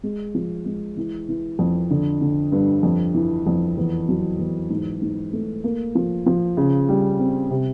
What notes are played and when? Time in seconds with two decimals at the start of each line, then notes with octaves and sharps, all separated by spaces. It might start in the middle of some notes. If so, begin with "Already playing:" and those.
0.03 G#3
0.35 F3
0.66 G#3
0.97 E3
1.28 E3
1.59 F2
1.90 D3
2.21 D3
2.52 G2
2.83 F2
3.14 E3
3.46 F2
3.78 E2
4.08 F#3
4.39 E2
4.70 G#2
5.02 G#2
5.33 A3
5.64 A#3
5.95 F3
6.26 F3
6.57 C#3
6.89 G3
7.19 C4
7.50 C3